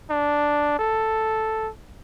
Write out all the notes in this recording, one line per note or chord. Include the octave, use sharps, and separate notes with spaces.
D4
A4